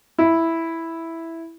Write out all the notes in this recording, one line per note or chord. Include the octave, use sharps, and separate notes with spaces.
E4